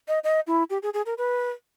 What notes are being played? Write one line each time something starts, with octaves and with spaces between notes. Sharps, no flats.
D#5
D#5
E4
G4
G#4
G#4
A#4
B4